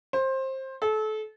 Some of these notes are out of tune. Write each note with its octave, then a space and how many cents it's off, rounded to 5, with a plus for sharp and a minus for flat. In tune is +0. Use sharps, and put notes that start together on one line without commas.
C5 +20
A4 -30